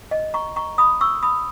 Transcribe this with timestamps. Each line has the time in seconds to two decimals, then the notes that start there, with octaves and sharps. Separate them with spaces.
0.11 D#5
0.34 A#5 C#6
0.56 A#5 C#6
0.78 B5 D#6
1.01 C#6 E6
1.23 B5 D#6